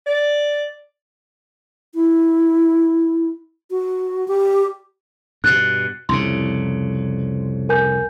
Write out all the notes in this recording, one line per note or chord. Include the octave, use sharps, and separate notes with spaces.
D5
E4
F#4
G4
G2 B2 F#6 A6
C2 F2 C#3 C6
A#4 G#5 G6